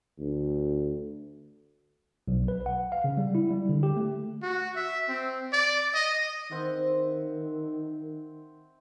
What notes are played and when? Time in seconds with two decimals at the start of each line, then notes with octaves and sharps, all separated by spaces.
0.19 D2
2.28 B1
2.48 B4
2.66 F#5
2.92 F5
3.04 C#3
3.17 G3
3.35 E4
3.50 G3
3.69 D3
3.83 G4
3.97 A3
4.42 F#4
4.76 E5
5.09 C4
5.53 D5
5.94 D#5
6.51 D#3 C4 E5 F#5